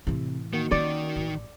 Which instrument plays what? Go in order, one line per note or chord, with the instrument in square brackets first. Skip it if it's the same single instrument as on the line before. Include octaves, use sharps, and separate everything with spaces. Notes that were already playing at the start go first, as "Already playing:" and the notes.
[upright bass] A2 E3 [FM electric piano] C3
[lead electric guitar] D#3 [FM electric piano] A#3 F#4
[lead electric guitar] D#3 [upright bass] C#4 D#4 [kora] D5
[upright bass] A1